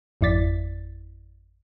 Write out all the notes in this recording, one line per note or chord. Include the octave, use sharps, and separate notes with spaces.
G#1 F2 E4 D5 A6 B6